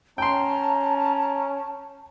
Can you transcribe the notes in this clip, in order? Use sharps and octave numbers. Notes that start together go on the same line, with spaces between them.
C#4 G5 A5 A#5 C6